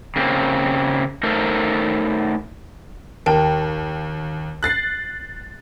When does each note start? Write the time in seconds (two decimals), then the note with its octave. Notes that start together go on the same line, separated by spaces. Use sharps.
0.16 C#3 A#3 C4
1.23 A3 D#4 A4 A#4 C5
3.26 D#2 A#4 G5 A5
4.63 F#6 A6 C7